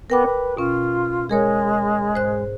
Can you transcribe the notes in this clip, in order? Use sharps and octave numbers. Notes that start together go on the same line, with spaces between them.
B3 A#4 G5 D6
B4
B2 C#4 F4
G#3 G#4 A#4 C#5
G#2 C5 F#6